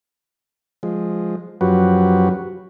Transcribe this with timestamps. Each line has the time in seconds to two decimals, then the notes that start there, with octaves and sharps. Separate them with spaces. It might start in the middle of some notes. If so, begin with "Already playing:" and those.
0.83 F3 G#3
1.61 F#2 F3 F#3 F#4 G4 B4